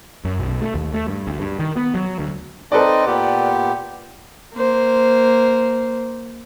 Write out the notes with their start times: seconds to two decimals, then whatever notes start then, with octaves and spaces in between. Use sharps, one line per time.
0.25 F#2
0.39 B1
0.61 A3
0.75 D#2
0.93 A3
1.08 G2
1.27 D2
1.39 G2
1.59 D#3
1.76 B3
1.95 F#3
2.19 D2
2.72 C4 D#4 A4 B4 D5 D#5
3.06 A#2 B3 G4
4.54 A#3 C5